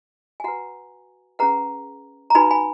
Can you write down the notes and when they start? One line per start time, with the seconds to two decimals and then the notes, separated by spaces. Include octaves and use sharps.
0.40 G#5
0.44 F#4 B4 F#5 A#5
1.39 C#4 G#4 B4 F#5 A#5
2.30 A#5
2.35 D#4 F#4 B4 G#5 B5
2.51 G#5 B5